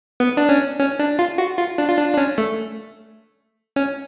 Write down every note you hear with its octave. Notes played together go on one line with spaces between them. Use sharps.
B3
D4
C#4
C#4
D4
F4
F#4
F4
D4
F4
D4
D4
C#4
A3
C#4